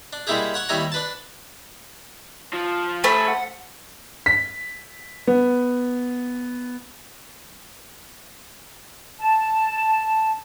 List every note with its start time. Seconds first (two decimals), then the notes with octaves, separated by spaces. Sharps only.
0.13 D4
0.27 G3 G#3 A#3 E4 G4 G#4
0.54 C#5 F#5 C#6
0.69 D#2 G3 E4 C#5 G#5 A#5
0.92 D4 B4 A5
2.53 F3
3.04 A3 A4 C5 G#5 B5
3.28 F#5
4.26 B6
5.27 B3
9.18 A5